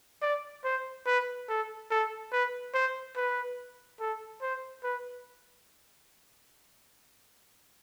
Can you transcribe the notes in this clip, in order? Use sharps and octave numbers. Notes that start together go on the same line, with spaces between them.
D5
C5
B4
A4
A4
B4
C5
B4
A4
C5
B4